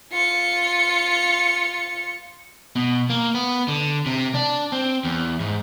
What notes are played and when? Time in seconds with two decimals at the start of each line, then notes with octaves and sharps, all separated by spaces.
0.13 F4 C#7
2.76 B2
3.10 A#3
3.34 B3
3.68 D3
4.06 C3
4.34 D4
4.72 C4
5.04 E2
5.40 G#2